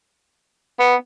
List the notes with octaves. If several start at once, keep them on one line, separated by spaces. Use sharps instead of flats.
B3